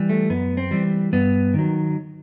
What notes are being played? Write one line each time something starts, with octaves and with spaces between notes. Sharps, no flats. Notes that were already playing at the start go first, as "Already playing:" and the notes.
Already playing: E3 G3
A3
F#2 B3
C4
E3 G3
G2 B3
D#3 F#3